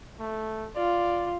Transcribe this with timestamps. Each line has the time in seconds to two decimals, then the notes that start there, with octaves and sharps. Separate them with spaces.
0.20 A3
0.76 F4 D5